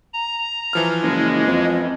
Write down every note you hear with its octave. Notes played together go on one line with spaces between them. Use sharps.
A#5
E3 F3 F6
F#1 G#3
F2